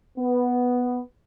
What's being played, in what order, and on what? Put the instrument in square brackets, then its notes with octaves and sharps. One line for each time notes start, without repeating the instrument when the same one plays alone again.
[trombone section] B3